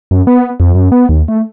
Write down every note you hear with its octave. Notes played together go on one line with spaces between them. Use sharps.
F#2
B3
F2
F#2
B3
D#2
A3